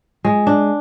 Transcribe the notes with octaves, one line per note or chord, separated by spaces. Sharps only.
G#3
D4